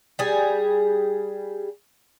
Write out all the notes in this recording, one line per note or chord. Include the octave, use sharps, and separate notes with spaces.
G3 G#4